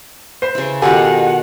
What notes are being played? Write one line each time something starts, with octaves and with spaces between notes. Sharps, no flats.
B4 C5 C6
C#3 E4
B2 D#3 F4 G4 A4 F#5 G#5